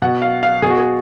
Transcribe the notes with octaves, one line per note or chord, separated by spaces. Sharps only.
B2 F#5
F5
F5
B2 G#4
F#4
G#4